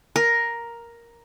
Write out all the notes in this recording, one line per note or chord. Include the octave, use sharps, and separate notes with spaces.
A#4